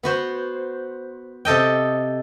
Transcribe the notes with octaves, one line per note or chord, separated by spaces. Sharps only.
B3 F#4 C5
C3 A4 D#5 G5